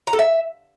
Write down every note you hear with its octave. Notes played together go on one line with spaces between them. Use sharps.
A#5
A4
E5